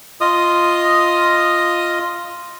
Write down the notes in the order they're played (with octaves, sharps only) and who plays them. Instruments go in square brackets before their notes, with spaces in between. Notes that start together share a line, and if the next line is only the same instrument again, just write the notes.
[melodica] F4 D#5 D#6